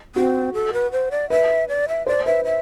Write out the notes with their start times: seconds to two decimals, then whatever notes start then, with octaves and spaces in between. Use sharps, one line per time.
0.15 C4 F#4
0.54 A4
0.73 B4
0.92 C5
1.11 D5
1.30 B4 E5
1.69 D5
1.88 E5
2.06 C5 D5
2.26 B4 E5
2.45 E5